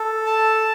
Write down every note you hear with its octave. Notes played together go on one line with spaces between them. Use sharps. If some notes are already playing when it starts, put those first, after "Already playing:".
Already playing: A4
A5